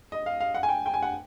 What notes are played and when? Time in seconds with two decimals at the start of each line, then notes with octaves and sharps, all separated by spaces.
0.12 D#5
0.26 F5
0.40 F5
0.55 F#5
0.63 G#5
0.69 G5
0.86 G5
0.94 G#5
1.02 F#5